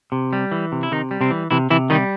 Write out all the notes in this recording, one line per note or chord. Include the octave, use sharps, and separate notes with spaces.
C3
G3
E3
C3
E4
C3 D#3 D#4
G3
C3 C4
E3
C3 E3 E4
C3 E3 E4
D#3 G3 D#4